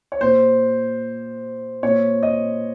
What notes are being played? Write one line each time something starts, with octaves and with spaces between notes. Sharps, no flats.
C#5
A#2 C5
A#2 C#5
D#5